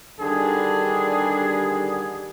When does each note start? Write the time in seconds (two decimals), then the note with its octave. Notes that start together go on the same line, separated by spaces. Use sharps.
0.20 D3 D#3 G3 D4 G#4